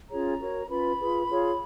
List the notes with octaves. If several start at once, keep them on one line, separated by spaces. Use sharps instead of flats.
C#4 F4 G#4 C#5 A#5
F#4 A#4 C#5
C#4 F4 B4 B5
F4 G#4 B4
F4 G#4 C#5